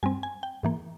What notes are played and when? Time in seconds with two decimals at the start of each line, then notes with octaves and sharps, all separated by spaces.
0.03 G2 G3 C4 G#5
0.23 G#5
0.43 G5
0.63 G#2 E3 A#3